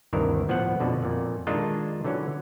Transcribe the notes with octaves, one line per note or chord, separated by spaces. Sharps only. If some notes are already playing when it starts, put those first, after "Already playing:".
D2 G2 C3 D#3 E3 A#4
A2 F3 B3 C5 F#5
F2 B2 D3
F2 A#2
D#3 G#3 D4 D#4 F4 A4
D3 E3 F#3 C#4